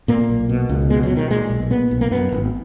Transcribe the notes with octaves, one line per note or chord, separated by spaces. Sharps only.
A#2 A#3
B1
B2
C#2
B2 G#3
F#3
B2
D#3
A#2 G#3
B1
A#2 B3
B1
A#3
F#2 B3
G#1